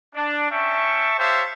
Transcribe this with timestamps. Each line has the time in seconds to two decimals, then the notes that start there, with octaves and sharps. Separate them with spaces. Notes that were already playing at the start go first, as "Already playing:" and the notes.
0.15 D4
0.51 C#4 E5 G5 A5 C#6
1.18 G4 C5 C#5 E5 F5 A5